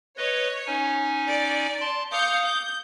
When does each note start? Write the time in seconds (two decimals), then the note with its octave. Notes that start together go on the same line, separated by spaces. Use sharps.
0.18 B4 C#5 D#5
0.67 C#4 D#4 G#5
1.28 D5
1.81 A5 C6
2.11 F5 D6 D#6 G6 C#7
2.44 G6